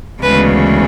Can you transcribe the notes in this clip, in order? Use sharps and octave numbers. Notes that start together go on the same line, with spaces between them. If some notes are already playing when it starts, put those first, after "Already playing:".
D2 C#3 E3 G#3 B3 B4